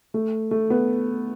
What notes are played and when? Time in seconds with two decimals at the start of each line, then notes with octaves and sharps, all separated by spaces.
0.14 A3
0.51 A3
0.70 B3